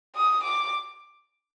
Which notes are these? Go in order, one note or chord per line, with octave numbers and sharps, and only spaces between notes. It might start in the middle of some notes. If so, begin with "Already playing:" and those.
D#6
D6